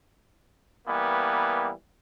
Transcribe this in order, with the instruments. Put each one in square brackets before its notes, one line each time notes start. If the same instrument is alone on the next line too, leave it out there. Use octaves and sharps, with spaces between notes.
[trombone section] E3 G3 A#3 B3